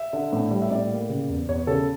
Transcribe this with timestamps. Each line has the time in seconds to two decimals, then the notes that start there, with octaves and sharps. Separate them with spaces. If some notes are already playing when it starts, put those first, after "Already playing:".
Already playing: E5
0.13 D3
0.33 A2
0.51 G3
0.62 E5
0.70 A2 D5
0.91 A#3
1.09 C#3
1.30 E2
1.49 E2 C#5
1.67 C#3 A4